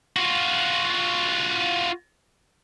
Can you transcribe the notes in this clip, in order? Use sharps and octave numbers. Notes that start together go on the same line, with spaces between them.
F4 F#4